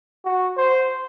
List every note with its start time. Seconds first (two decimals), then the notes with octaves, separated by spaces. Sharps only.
0.25 F#4
0.57 C5